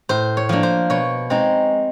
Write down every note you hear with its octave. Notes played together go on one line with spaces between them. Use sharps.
A2 C5
C#5
F3 A#3 D4
C5
B2 C#5
G#3 C4 D#4